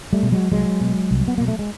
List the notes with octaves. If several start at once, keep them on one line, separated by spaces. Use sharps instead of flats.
G3 A3
B2
F#3 G#3
C2 F#3 G#3
B2
C2
B3
B2 A#3
A3
G#3